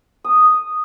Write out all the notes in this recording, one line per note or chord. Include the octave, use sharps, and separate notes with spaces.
D#6